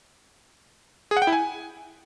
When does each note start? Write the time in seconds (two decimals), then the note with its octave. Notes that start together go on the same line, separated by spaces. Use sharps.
1.11 G#4
1.17 F#5
1.22 G5
1.27 E4
1.33 G#5